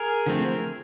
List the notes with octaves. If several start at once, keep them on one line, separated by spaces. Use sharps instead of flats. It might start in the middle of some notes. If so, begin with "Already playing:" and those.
Already playing: G#4 A#4
D3 F3 A3 C4